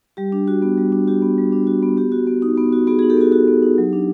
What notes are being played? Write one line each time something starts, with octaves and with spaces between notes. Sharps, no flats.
G3 G4
D4
F#4
B3
G3
D4
F#4 G4
B3
G3
D4
F#4
B3
B3 G4
F#4
B3
D#4
B3
F#4
B3 F#4 G#4
D#4 F#4 G#4
G4 A4
B3 F#4 G#4
F#4 G4
B3
D#4
F#3
D4